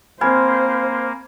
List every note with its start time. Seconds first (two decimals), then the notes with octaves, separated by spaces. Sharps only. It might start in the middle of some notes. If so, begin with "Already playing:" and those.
0.21 A#3 C4 C5 G#5 B5 F6 G#6